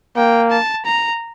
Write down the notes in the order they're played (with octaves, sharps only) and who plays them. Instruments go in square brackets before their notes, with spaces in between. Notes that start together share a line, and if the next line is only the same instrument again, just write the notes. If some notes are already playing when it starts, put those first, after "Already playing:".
[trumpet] A#3 [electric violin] G5
[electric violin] A5
A#5